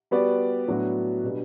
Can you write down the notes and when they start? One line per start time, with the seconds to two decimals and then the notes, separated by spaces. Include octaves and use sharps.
0.11 G3 B3 F#4 B4 D5
0.68 A2 F#3 B3 D4 F#4
1.23 B2 G3 B3 D4